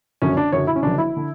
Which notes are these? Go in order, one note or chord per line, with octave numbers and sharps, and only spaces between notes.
F#1 F#2 D3 C#4
D4
F#1 F#2 D3 C#5
E4
C#4
F#1 F#2 D3 D4
E4
D3